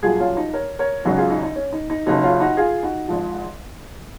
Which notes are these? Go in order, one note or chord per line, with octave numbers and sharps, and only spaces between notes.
C2 A#2 F#3 F4 G#4
C#4 F4
D#4
A#4 C#5
A#4 C#5
G#1 F#2 C#3 F#3 D#4 F#4
F4 G#4
D#4
D#4
C#4
D#4
D#4
F#1 F#2 C#3 F#3 D#4
C#4 F4
D#4 F#4
F4 G#4
D#4 F#4
G#1 G#2 F3